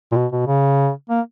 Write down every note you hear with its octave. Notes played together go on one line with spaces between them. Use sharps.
A#2
B2
B2
C#3
A#3